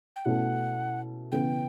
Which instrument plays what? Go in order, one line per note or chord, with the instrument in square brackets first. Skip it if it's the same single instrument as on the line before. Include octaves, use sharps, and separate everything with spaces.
[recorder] G5
[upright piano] B2 A3 C#4 E4 [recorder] F#5
[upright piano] C#3 E3 B3 [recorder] G5